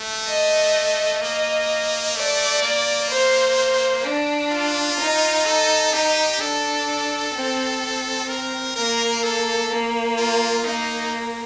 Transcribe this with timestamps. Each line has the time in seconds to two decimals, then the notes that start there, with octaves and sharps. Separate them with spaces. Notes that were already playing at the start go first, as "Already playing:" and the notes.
Already playing: A3
0.27 D#5
1.22 A#3 D#5
2.16 A3 D5
2.62 A#3
3.10 C5
4.05 D4
4.52 F4
4.99 D#4
5.46 A4
5.92 D#4 G4
6.40 D4 A4
7.34 C4
7.82 C4
8.29 A#4
8.76 A#3 A#4
9.23 A4
9.70 A#3
10.18 F4
10.65 A#3 D#4